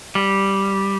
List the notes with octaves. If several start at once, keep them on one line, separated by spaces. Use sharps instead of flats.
G3